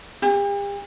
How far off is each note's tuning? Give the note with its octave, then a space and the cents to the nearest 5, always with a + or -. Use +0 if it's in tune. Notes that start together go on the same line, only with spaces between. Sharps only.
G4 +45